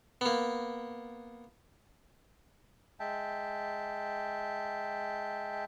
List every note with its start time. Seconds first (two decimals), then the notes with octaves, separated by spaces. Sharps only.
0.21 A#3 B3
3.00 G#3 E5 G5 A5